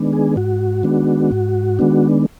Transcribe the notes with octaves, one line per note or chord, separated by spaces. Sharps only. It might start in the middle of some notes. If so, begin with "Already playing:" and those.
Already playing: D#3 G#3 B3 D4
G#4
G#2 F#4
D#3 G#3 B3 D4
G#2
D#3 G#3 B3 D4